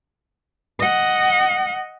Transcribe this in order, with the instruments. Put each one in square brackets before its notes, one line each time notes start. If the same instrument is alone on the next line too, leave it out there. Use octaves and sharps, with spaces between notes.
[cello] D#5 F#5